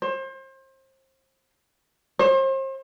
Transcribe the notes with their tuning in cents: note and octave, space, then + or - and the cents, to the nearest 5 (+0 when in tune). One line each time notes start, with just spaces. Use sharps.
C5 +30
C5 +40